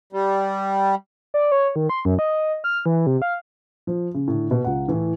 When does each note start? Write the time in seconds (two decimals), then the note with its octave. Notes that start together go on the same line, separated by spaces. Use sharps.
0.13 G3
1.34 D5
1.52 C#5
1.76 D#3
1.90 C6
2.05 F#2
2.19 D#5
2.64 F6
2.86 E3
3.07 C3
3.22 F5
3.87 F3
4.14 C#3
4.28 A2 D3
4.51 B2
4.64 C#2 F#5
4.88 A2 E3